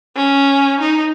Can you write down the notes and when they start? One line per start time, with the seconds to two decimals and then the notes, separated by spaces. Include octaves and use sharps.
0.16 C#4
0.80 D#4